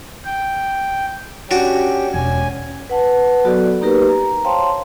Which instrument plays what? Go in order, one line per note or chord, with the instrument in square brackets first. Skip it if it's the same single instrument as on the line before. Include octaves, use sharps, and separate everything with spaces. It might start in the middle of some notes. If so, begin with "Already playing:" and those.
[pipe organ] G5
[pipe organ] C#4 G4 [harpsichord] D4 F#4
[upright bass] E1 [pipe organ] C#4 G#5
[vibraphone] B4 F#5 A5
F#3 B3 F#4 A4 D5
A#3 D#4 G4 A#4 B4
A#5
C5 C#5 F5 G5 A5 C6